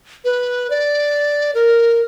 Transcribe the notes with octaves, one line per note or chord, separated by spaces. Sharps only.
B4
D5
A#4